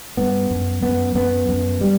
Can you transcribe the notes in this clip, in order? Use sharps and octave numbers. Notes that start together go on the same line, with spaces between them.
G2 B3
F#2
F#2 B3
F#2 B3
F#2
G3